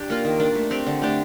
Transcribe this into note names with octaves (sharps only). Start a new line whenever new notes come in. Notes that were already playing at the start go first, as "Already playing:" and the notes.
Already playing: D4 G4
A#3 F4
D#3
A#3 D4
A3
C4 G4
D3
A3 D4 G4